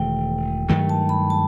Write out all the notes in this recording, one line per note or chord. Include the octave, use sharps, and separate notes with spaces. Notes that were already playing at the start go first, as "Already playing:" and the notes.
Already playing: E1 D#3 A3 G5
G2 D#3 F#3 A3 G5
A5
B5
A5